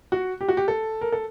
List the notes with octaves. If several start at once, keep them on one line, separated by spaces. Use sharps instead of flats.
F#4
G4
F#4
G4
A4
A#4
A4